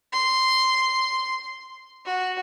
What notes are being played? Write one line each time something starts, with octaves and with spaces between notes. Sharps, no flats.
C6
F#4